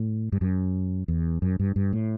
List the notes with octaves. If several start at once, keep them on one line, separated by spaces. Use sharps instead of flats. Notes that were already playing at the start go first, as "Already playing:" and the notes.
Already playing: A2
G2
F#2
E2
F#2
G2
G2
A2